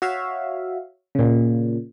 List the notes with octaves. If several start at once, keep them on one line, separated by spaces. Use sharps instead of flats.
F#4 C#5 E5 F5
A#2 C#3